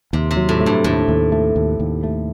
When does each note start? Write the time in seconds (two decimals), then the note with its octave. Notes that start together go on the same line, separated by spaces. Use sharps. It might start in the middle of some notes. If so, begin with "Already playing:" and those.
0.13 D#2 C3
0.31 C3
0.37 F#3
0.49 A2
0.61 A3
0.66 G2
0.84 D#2 A2
1.08 D#2
1.32 A3
1.56 D#2
1.79 D#2
2.03 A3